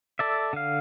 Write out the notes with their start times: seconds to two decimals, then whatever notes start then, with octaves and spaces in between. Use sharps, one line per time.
0.19 A4 D5 E5
0.53 D3 F5